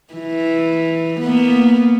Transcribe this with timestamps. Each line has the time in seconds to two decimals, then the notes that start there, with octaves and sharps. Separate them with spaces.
0.13 E3
1.20 A#3 B3